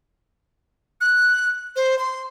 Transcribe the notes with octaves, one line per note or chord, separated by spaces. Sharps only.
F#6
C5
C6